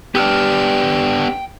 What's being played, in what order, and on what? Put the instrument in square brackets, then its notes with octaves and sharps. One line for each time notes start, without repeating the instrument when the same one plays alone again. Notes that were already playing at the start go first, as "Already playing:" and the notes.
[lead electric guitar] B3 D4 [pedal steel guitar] G4 E6 F6 [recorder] G5